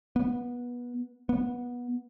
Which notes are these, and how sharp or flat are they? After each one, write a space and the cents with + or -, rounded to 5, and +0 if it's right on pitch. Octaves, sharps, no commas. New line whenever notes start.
B3 -20
B3 -20